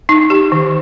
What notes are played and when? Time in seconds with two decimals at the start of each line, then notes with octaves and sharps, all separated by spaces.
0.09 D#4
0.30 G4
0.52 D#3